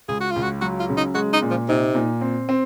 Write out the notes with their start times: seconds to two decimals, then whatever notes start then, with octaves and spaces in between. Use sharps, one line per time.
0.08 C#2 G#4
0.20 F#4
0.31 C#2 F4
0.43 F#4
0.61 F#3 F#4
0.80 F4
0.89 C#3
0.97 D#4
1.15 G#3 F#4
1.33 D#4
1.42 A#2
1.50 F3
1.68 C3 D#4
1.95 A#2
2.21 C4
2.49 C4